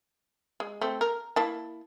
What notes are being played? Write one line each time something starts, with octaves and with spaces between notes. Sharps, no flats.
G#3
A3 C4
A#4
A#3 E4 A5